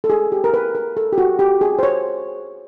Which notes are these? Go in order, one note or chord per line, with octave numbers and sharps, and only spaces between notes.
A4
G#4
G4
A#4
B4
A#4
A4
G4
F#4
G4
G#4
C5
C#5